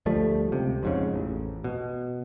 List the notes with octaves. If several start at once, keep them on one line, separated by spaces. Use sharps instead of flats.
D2 F3 G3 A3
C#2 C3
F2 G#2 C#3
A1
B2